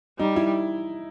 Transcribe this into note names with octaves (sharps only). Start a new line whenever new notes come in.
G3 D#4
E4